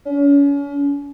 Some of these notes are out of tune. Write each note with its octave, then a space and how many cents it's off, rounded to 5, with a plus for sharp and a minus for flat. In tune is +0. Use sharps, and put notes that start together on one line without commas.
C#4 +35